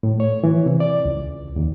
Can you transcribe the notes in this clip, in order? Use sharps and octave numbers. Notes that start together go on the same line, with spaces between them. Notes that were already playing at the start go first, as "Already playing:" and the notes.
A2
C#5
E3
C3
D5
C#2
D#2